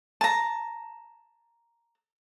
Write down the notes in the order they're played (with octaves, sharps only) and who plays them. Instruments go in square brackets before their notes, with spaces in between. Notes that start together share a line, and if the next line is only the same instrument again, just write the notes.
[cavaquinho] A5 A#5